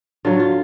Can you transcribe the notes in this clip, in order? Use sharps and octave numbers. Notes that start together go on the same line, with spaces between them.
D3 F#3 F4
F4